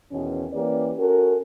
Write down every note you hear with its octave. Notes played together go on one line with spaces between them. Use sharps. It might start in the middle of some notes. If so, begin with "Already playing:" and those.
E2 B2 D#3 C#4
E3 A#3 C#4 G4 B4 D5
C#4 F#4 A4 A#4